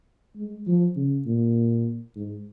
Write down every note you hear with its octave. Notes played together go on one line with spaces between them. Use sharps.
G#3
F3
C#3
A#2
G#2